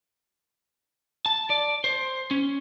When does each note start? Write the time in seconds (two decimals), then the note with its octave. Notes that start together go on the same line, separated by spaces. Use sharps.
1.26 A5
1.50 D5
1.84 C5
2.31 C#4